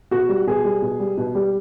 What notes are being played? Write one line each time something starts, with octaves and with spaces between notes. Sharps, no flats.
B2 F#4
G3
B2 G#4
G3
B2
G3
B2
G3